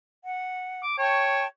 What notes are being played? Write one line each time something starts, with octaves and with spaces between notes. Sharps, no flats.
F#5
D6
C#5 G5 A5 C#6